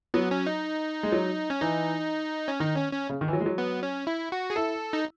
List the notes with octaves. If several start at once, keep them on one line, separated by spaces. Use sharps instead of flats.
F#3 B3
C#4
D#4
G#3
F#3
C#4
E3 D#4
C#4
D#3 D#4
C#4
C#4
C#3
D#3
E3
F#3
G#3
F#3
B3
C#4
E4
F#4
G#4
E4 A4
D#4